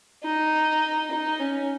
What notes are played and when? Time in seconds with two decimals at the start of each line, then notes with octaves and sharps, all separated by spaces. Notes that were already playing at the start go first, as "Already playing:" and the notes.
0.23 D#4
1.11 D#4
1.40 C#4